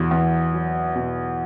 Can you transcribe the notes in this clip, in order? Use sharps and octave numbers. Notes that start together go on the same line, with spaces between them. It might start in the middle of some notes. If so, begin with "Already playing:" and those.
Already playing: E2 B2
E2
F#3
B2